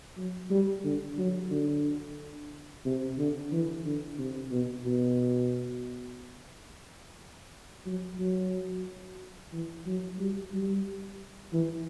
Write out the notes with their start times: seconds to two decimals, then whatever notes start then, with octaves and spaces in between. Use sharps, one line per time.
0.17 F#3
0.50 G3
0.84 D3
1.18 F#3
1.51 D3
2.85 C3
3.18 D3
3.52 E3
3.85 D3
4.18 C3
4.51 B2
4.86 B2
7.86 F#3
8.20 F#3
9.53 E3
9.86 F#3
10.19 G3
10.53 G3
11.53 E3